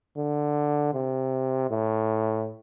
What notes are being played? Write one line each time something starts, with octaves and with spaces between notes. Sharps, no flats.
D3
C3
A2